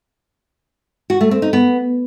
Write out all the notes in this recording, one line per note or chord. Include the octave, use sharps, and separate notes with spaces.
F#4
A3
C4
D#4
B3